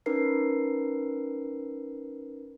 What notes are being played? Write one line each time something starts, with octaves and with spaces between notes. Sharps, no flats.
C#4 D#4 A#4 B4 C7